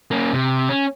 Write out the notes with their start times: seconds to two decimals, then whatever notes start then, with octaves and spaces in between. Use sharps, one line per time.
0.11 A#3 C#4
0.33 C3
0.69 C#4